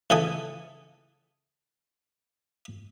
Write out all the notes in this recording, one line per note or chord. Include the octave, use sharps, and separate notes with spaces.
C#3 E3 A4 G#5 D#6